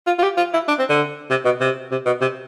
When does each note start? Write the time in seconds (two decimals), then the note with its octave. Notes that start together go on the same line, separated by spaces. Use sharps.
0.07 F4
0.19 F4
0.23 G4
0.38 F4
0.54 E4
0.68 D4
0.79 C4
0.89 D3
1.30 C3
1.45 B2
1.61 C3
1.92 C3
2.06 B2
2.21 C3